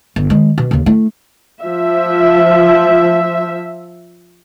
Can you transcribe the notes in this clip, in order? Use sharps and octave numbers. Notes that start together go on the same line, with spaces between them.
G1
D#3 G#3
B2
D#2 C#3
A3 E4
F3 E5